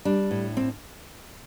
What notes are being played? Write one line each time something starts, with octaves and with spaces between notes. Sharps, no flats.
G3 D4
A2
C4